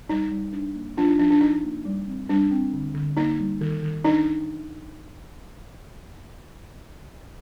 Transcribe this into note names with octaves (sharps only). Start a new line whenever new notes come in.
G3 D#4
G3
D4
A#3
F3 D4 F4
D#4
F3 D4
D4
D4 D#4
A#3
G3
C4
G3 D4
C4
D3
D3
A#3 D#4
G3
D#3
D#3
D4 D#4